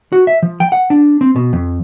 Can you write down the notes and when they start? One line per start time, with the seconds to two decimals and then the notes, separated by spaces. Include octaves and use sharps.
0.12 F#4
0.27 E5
0.43 F3
0.60 G5
0.72 F#5
0.90 D4
1.21 C4
1.36 B2
1.53 F2